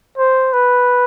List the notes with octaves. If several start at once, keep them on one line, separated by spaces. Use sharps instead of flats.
C5
B4